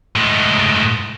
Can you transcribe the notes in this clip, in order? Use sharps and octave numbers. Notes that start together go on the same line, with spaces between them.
A2 G#3